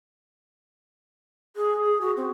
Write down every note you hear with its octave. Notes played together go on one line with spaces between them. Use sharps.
G#4
G#4
F#4
C4